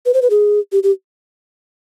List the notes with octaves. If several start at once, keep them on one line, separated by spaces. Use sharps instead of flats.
B4
C5
B4
G#4
G4
G4